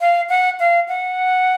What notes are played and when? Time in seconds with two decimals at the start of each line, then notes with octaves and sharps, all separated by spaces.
0.01 F5
0.29 F#5
0.60 F5
0.88 F#5